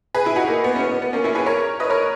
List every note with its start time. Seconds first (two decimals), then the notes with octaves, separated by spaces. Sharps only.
0.15 G#4 B4
0.25 E4 G#4
0.36 D#4 F#4
0.48 A#3
0.64 B3
0.76 C#4
0.80 B3
0.91 B3
1.02 B3
1.13 A#3 C#4
1.24 C#4 E4
1.35 G#4 B4
1.46 A#4 C#5
1.80 B4 D#5
1.90 A#4 C#5